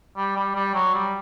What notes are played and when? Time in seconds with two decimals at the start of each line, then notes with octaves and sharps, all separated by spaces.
0.17 G3
0.36 G3
0.55 G3
0.75 F#3
0.94 G3